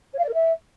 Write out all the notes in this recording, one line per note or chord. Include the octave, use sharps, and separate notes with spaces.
C#5
F5
D5
A#4
E5